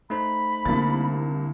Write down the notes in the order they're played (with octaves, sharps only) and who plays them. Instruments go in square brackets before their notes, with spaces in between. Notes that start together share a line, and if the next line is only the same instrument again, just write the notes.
[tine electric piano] A3 D#4 C5 [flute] B5
[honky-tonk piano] C2 A#3 A6 [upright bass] D3